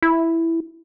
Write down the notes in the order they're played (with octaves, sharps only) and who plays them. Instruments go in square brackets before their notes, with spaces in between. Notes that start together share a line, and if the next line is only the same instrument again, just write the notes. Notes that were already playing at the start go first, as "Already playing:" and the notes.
[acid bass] E4